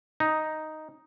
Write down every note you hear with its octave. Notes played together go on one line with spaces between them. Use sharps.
D#4